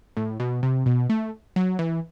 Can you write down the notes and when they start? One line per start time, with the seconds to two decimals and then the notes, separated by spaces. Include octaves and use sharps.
0.17 A2
0.40 B2
0.63 C3
0.86 B2
1.10 A3
1.56 F#3
1.79 E3